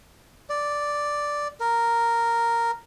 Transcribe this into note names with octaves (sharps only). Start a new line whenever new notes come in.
D5
A#4